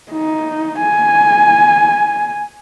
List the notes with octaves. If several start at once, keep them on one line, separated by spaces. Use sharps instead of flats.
D#4
G#5